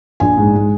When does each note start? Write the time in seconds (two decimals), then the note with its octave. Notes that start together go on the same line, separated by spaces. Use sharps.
0.20 A#1 G#5
0.38 G#2
0.55 G#3